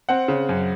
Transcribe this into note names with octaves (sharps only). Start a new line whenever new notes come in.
C4 F#5
C#3
F#2